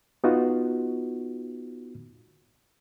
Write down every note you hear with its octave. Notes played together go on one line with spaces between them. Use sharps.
B3 D#4 F4 F#4